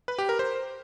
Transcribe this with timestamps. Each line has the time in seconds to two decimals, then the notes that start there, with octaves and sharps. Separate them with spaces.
0.08 B4
0.18 G4
0.29 A#4
0.39 C5